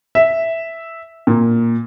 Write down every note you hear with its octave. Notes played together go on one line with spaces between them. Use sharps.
E5
A#2